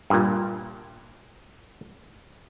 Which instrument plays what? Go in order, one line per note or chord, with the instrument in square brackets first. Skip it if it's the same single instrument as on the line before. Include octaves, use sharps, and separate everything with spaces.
[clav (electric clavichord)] G2 A#2